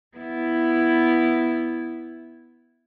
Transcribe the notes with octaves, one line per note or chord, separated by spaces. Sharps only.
B3 E4